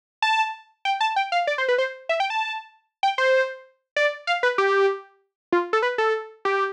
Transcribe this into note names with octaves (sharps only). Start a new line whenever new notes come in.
A5
G5
A5
G5
F5
D5
C5
B4
C5
E5
G5
A5
G5
C5
D5
F5
B4
G4
F4
A4
B4
A4
G4